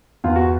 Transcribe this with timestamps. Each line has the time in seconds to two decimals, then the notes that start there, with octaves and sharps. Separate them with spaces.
0.24 E2 F4
0.36 F#4